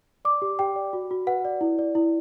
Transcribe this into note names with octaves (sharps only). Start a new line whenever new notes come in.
D5 D6
G4
G4 G5
D5
F#4
F#4
B4 F#5
D5
E4
D5
E4